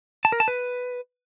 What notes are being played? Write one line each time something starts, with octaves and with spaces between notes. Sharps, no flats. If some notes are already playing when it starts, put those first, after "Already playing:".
A5
A#4
A5
B4